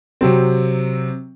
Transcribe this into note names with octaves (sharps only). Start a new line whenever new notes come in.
C3 F#3 C4